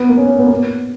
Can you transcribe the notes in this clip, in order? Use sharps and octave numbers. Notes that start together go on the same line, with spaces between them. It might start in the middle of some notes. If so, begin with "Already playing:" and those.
Already playing: B3
A#3
C#4
A#3
B3
A#3
B3